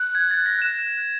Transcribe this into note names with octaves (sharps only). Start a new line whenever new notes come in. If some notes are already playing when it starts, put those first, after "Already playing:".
Already playing: F#6
G#6
A6
A#6
E7